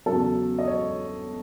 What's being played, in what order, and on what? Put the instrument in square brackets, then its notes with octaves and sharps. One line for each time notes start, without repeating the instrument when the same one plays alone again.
[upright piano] E2 C#3 F#3 A4
D#5
C#5